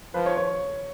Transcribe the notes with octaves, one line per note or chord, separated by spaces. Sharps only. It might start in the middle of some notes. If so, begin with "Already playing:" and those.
F3 B4
C#5
C#5